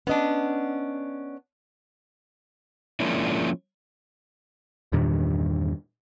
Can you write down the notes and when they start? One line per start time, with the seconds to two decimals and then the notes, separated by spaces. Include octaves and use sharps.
0.07 B3 C#4 D4 D#5
3.00 F3 G#3 A#3 C#4 D4 E4
4.92 E2 G2 A#2 D#3